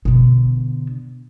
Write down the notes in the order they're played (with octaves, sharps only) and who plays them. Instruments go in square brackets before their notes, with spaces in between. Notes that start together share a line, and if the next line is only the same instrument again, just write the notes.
[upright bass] B2 D3